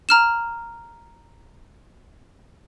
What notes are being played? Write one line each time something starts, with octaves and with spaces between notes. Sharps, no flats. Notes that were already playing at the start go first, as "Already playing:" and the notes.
A#5 F6 E7